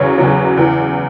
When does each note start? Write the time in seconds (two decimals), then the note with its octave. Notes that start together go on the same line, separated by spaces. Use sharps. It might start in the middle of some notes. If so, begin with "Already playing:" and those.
Already playing: E2 C#3 F#3 C#5
0.18 E2 C#3 F#3
0.57 E2 C#3 E3